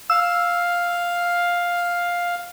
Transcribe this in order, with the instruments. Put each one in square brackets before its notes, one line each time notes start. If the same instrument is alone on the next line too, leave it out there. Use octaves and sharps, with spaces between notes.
[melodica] F5 [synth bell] E6